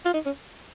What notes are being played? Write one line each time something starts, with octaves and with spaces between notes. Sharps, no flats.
F4
D#4
C#4